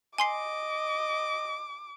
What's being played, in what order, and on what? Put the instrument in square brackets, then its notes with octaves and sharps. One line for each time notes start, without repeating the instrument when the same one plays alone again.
[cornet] D#5 [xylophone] G#5 C6 C7 [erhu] D6